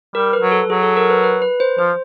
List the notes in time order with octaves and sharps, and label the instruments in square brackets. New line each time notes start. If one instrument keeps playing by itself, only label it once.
[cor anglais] G3 [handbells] A#4
[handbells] B4
[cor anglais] F#3
[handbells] A4
[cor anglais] F#3 [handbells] G#4
[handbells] A4
A#4
B4
B4
B4
C5
[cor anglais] F3 [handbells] C5